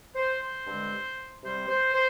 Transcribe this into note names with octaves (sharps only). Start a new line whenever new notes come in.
C5
C5
G2 D3 G#3 C4
C3 G3 C4 C5
C5
C5